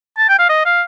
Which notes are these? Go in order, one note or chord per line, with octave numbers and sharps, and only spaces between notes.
A5
G5
F5
D#5
F5